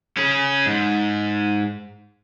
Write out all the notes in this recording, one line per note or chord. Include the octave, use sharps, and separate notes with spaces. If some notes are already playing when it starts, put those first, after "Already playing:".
C#4 G#4
G#2